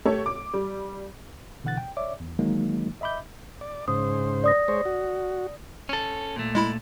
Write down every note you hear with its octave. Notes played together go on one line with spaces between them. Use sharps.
A3 G4 A4 C#5
D6
G3
B2 D3 E3 F#5 F#6 A6
G5
C#5 D5 E5 D6
E2
D#3 E3 F#3 G#3 A#3 D#4
D#5 E5 B5 D6 G6
D5
G#2 C#3 C5 D#6
D5 D#6 A#6
G#3 C5 C#5
F#4
C#4 A4
A#2 A3
G#3 E4 B5